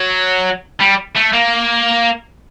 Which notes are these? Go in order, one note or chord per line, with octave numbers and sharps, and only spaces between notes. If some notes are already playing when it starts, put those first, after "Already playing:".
Already playing: F#3
G3
A3
A#3